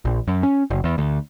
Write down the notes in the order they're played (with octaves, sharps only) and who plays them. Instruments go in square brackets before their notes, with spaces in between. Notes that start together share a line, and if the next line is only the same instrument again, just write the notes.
[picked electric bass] A#1
F#2
C#4
F#1
E2
D2